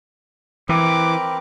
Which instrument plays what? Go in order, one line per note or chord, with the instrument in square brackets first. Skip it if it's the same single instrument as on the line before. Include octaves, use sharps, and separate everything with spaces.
[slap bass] E3 [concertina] C4 A#4 B4 [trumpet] D6